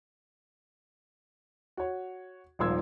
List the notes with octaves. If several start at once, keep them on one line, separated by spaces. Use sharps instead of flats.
F#4 C#5
D#1 G#1 F3 C6 E6 G#6